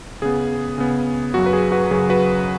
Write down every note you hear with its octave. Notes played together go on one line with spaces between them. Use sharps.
C#3 B3 G#4
C#3 B3
F#2 C#3 F#3 F#4
B4
G#4
F#4 B4
F#2 C#3 F#3 G#4
F#4 B4